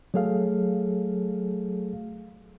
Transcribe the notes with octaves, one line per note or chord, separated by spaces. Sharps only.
F#3 A3 G#4 A4 F5